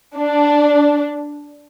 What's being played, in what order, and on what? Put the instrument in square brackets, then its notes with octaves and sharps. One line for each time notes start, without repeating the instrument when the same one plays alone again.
[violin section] D4